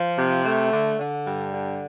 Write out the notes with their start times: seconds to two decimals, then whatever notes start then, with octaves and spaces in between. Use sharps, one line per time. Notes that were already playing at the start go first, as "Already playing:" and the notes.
Already playing: F3
0.18 C3
0.45 A3
0.72 D3
0.99 D3
1.26 G2
1.53 D3